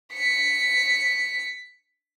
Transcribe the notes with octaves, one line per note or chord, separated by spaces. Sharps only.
B6 C#7